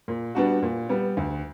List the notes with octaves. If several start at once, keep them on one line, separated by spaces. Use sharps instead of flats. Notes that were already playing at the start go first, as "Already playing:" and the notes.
A#2
G3 B3 D4 F#4
A#2
G3 B3
D2